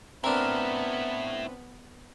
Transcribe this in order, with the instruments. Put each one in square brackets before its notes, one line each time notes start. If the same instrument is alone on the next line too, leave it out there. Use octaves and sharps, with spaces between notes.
[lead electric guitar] A2 E4 [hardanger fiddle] B3 B4 [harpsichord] C4 D4 [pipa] A#4